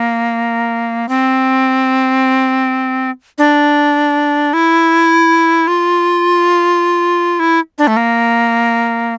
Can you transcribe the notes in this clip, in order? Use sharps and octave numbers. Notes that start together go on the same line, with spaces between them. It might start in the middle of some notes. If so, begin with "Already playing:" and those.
Already playing: A#3
C4
D4
E4
F4
E4
D4
A3
A#3